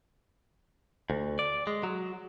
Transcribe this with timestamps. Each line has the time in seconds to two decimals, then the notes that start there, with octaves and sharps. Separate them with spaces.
1.10 D2
1.39 D5
1.67 G#3
1.83 F#3